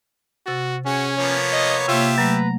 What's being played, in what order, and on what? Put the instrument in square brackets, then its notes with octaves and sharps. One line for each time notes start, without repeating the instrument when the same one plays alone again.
[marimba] C3 A6 [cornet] F#4
[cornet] C#4 [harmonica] F#4 [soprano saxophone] G#4
[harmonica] F3 A#3 B3 [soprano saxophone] C#5
[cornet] D#5
[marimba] C3 A#3 [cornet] F4 [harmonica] G4 E5
[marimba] F#3 A3 [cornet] B4 [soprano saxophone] A#5